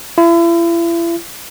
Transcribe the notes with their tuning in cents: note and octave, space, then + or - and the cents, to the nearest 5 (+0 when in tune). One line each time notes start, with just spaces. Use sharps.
E4 +40